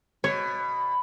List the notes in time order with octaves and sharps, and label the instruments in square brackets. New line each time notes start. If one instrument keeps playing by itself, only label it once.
[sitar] B2 [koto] C#5